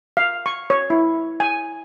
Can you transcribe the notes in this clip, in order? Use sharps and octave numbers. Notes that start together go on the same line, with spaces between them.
F5
C#6
C#5
E4
G#5